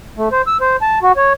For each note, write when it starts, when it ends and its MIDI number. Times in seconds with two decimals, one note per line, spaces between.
0.17 0.29 57
0.32 0.42 72
0.47 0.57 88
0.61 0.76 72
0.82 0.99 81
1.03 1.12 66
1.17 1.33 73